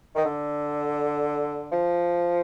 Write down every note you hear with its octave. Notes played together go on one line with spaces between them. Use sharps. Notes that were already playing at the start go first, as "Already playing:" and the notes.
D#3
D3
F3